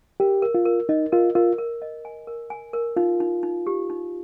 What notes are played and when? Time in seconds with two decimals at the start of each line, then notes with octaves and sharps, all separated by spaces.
0.20 G4 A#4
0.42 A#4
0.55 F4
0.65 A#4
0.89 D#4 D#5
1.12 F4 A#4
1.35 F4 A#4
1.58 A#4
1.82 D#5
2.05 G#5
2.27 A#4
2.50 G#5
2.73 A#4
2.97 D#4 F4
3.20 D#4
3.43 D#4
3.67 G4
3.90 D#4